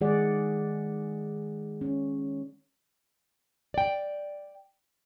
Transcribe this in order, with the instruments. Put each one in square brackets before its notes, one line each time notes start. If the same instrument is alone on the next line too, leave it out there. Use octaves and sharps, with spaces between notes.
[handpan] D#3 G#3 G#4 D5 F#5
C#4
[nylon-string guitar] D5 G5